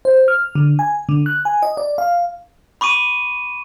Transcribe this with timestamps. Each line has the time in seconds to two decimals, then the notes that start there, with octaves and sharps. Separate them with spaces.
0.05 C5
0.28 F6
0.55 D3
0.79 G#5
1.09 D3
1.26 F#6
1.45 G#5
1.63 D#5
1.77 D5
1.98 F5
2.81 B5 C#6 D6 D#7